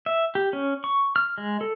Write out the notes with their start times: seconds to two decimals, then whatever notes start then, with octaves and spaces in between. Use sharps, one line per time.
0.06 E5
0.35 G4
0.53 C#4
0.84 C#6
1.16 F6
1.38 G#3
1.61 A4